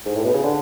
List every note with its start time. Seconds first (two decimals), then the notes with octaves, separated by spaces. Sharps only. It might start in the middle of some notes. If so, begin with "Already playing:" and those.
0.06 G#2
0.15 A2
0.24 B2
0.33 C#3
0.43 D3